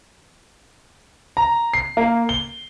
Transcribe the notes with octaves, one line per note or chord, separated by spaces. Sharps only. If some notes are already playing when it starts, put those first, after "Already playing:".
A#5
C7
A#3
G7